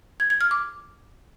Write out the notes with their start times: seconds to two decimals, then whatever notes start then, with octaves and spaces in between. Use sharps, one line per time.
0.20 G#6
0.30 G#6
0.41 F6
0.51 D6